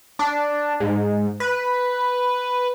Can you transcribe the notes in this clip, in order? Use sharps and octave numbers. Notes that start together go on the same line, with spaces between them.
D4
G#2
B4